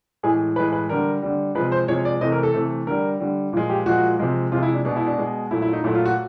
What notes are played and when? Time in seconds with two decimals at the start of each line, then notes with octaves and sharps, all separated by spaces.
0.23 A2 E3 G#3 G#4
0.56 A2 E3 G#3 B4
0.73 B4
0.89 D3 G3 A#4
1.22 D3 G3
1.55 C3 F3 G#3 B4
1.72 C5
1.88 C3 F3 G#3 C#5
2.05 D5
2.21 C3 E3 A3 D#5
2.32 A#4
2.43 A4
2.54 C3 E3 A3
2.87 D3 G3 A#4
3.20 D3 G3
3.53 A#2 F3 G#3
3.70 G4
3.86 A#2 F3 G#3 F#4
4.19 C3 F3 G#3
4.52 C3 F3 G#3 F4
4.63 E4
4.74 D4
4.85 B2 G#3 D4
4.96 E4
5.07 D4
5.18 B2 G#3
5.51 A#2 F#3 A3 E4
5.62 E4
5.73 D#4
5.84 A#2 F#3 A3 E4
5.95 F4
6.05 F#4